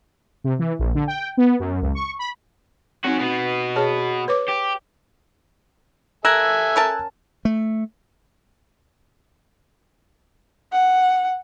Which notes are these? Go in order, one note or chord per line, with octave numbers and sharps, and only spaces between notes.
C3
E3
A#1
D3
G5
B3
F#2
C#2
C#6
B5
C4 C#4 D#4 F#4
B2 B3
G#4 C#5 A5
B4 C#5 D6
G4
A4 A#4 E5 G#5 E6 F#6 G#6
C#4 A#4 A5
A3
F#5